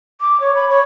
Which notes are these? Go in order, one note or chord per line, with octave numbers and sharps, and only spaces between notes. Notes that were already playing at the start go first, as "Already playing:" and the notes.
D6
C#5
B5
C#5